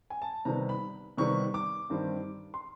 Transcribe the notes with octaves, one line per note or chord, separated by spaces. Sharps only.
G#5
A5
C3 D#3 G3 B3 A#5
B5
C3 D#3 G3 B3 C#6
D6
G2 D#3 G3 C4
C6